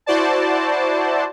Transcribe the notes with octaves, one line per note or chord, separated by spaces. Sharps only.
E4 F#4 C5 D5 A5